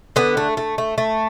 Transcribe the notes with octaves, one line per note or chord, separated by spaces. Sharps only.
D3 B3
A3
A3
A3
A3